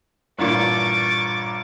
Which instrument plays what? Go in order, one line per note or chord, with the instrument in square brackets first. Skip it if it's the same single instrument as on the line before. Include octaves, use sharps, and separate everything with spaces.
[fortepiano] A1 G2 A#2 [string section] C#6 D6 A6